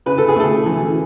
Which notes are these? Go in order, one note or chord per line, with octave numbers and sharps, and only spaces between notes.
C#3 B4
A4
G#4
A3 A4
E3